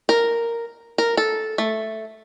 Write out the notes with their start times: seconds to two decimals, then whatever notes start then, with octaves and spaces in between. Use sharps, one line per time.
0.09 A#4
0.98 A#4
1.17 A4
1.58 A3